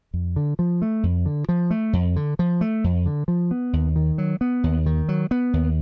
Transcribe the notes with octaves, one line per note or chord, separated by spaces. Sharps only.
F2
D3
F3
A3
F2
D3
F3
A3
F2
D3
F3
A3
F2
D3
F3
B3
D#2
D#3
F#3
B3
D#2
D#3
F#3
B3
D#2